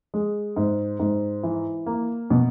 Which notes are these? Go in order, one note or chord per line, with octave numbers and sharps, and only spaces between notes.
G#3
G#2
G#2
E3
A#3
B2